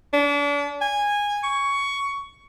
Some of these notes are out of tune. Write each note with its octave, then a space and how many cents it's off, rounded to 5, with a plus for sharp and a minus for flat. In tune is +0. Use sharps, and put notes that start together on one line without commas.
D4 -35
G#5 -15
C#6 +15